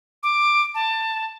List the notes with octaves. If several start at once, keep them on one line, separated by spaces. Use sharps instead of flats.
D6
A5